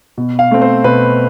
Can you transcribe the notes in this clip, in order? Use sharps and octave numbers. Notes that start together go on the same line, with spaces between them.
B2
F5
A3 C4
C5
B2 B4